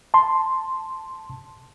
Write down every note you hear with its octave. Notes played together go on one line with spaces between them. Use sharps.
A5 C6